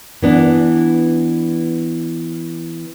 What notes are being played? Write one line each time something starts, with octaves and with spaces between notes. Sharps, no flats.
E3 B3 D4